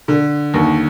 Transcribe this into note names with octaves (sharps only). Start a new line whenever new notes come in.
D3
D#2